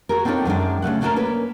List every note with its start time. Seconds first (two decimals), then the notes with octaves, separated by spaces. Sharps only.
0.09 F#4 G#4 A#4
0.25 C4 D4 D#4 F4 A4 C#5
0.45 F#2 D#3 G#3 D4
0.82 C#3 F3 A3 F#5
1.01 A3 C#4 D4 F#4 A4 A#4
1.16 A#3 C#4 B4